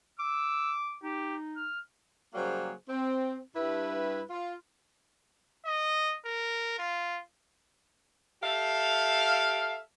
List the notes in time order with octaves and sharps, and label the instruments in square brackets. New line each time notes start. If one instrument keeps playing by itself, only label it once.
[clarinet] D6 [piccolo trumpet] E6
[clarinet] D#4 [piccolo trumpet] G4
[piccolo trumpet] F6
[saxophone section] C#3 F#3 G3 A#3 G#4 C5
C4
G2 E4 B4
F4
[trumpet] D#5
A#4
F4
[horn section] G4 A4 E5 F5